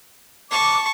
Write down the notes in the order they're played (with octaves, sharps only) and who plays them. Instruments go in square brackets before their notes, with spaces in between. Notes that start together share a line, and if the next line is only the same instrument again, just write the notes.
[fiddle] A5 C#6 [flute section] D6